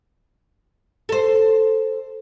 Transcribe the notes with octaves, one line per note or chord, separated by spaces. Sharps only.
A4 C5